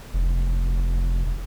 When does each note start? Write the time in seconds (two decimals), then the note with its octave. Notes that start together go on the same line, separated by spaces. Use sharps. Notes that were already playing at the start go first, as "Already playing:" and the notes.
0.13 F1